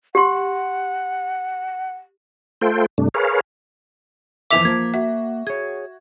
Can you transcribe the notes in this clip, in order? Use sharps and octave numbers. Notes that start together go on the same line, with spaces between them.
G4 F#5 C6
A3 F4 A4 C5 G5
G2 C3 A3 D4
G#4 A#4 B4 C#5 F5
F2 E3 E5 D6 B6 F7
F3 A#3 G#6
F#4 E5
G#4 C#5 G#6